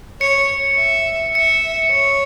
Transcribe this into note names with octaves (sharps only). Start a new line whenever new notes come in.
C#5 C#7
E5
E5 C#7
C#5